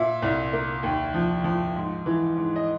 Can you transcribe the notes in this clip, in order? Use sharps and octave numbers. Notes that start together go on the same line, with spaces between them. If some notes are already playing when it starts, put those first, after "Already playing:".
Already playing: A#2 E5
C2
A#3
D#2
F3
F3
G#2
E3
G#2
D#5